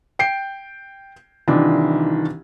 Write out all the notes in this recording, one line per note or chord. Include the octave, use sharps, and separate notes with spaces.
G5 G6 C7 D7
C2 D#3 E3 D4 F4